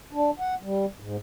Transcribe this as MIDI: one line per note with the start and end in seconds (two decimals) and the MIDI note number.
0.13 0.31 62
0.40 0.55 78
0.63 0.85 55
1.00 1.16 44